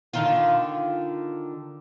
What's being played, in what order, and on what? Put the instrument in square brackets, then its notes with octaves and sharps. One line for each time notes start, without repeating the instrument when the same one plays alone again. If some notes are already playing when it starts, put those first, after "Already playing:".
[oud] D3 D#3 F4